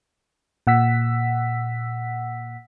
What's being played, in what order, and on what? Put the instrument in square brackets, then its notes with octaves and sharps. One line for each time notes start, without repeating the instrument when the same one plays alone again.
[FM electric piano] A#2 F#5 E6 B6